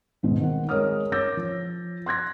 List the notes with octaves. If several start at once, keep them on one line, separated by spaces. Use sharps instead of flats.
D#1 G#1 G#2 B2
D#3 C4 F#5
G#3 A#4 C#5 D#6 F6
C#5 D6 E6 G6 A6 A#6
F3
C6 F#6 G#6 A#6